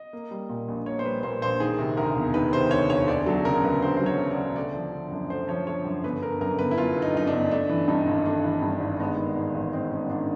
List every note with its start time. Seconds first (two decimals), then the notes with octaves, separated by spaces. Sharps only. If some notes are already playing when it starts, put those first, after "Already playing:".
Already playing: D#5
0.13 A#3
0.31 G3
0.49 A#2
0.68 A#1
0.86 A#3 C#5
0.99 C5
1.05 G3 B4
1.23 A#2 C5
1.42 A#1 C5
1.60 D#3 G#4
1.79 C3
1.97 D2 A#4
2.16 E1
2.34 D#3 B4
2.53 C3 C5
2.71 D2 C#5
2.89 E1 C#5
3.08 D2 D5
3.26 F#3 A4
3.45 C#3 A#4
3.64 D2 B4
3.82 D2 C5
3.97 F#3 C5
4.06 C#5
4.19 C#3
4.31 D5
4.37 D2
4.56 A3 D5
4.74 F3
4.92 D3
5.11 F#2
5.30 A3 C5
5.48 F3 C#5
5.67 D3 C#5
5.85 F#2
6.04 G1 B4
6.22 D3 A#4
6.41 F#2 A#4
6.59 G1 B4
6.71 E4
6.78 G1 F4
6.96 D3
7.02 D#4
7.14 F#2 D#4
7.27 D4
7.33 G1
7.51 A3 D4
7.69 E3
7.88 G2 D#4
8.07 G#1
8.26 A3 D4
8.44 E3
8.62 G2
8.81 G#1
8.99 G#3 B3
9.17 D#3
9.36 G#2
9.55 A1
9.73 G#3 C4
9.91 D#3 C#4
10.09 G#2 D4